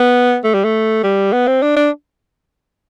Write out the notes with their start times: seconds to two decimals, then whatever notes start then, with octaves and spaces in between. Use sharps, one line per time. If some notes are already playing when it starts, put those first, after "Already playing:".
Already playing: B3
0.44 A3
0.54 G3
0.64 A3
1.03 G3
1.33 B3
1.47 C4
1.62 D4
1.77 D4